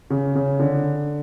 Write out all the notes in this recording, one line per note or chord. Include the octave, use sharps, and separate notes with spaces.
C#3
C#3
D3